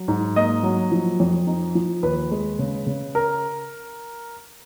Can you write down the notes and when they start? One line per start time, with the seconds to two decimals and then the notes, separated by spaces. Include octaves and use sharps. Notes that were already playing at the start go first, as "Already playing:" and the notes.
Already playing: F#3
0.08 G#2
0.36 A#3 D#5
0.63 F#3
0.91 F3
1.20 F2
1.47 D#4
1.75 F3
2.03 D#2 B4
2.31 G#3
2.59 C#3
2.87 C#3
3.15 A#4